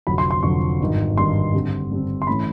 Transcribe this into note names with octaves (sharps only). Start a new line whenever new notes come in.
F1 F2 D3 F#3 B5
C6
C6
F1 F2 D3 F#3 C#6
G#1 G2 D#3
G#1 G2 D#3 C6
G2 D3 G3 C4
G2 D3 G3 C4
C6
A2 E3 A3 C#4 B5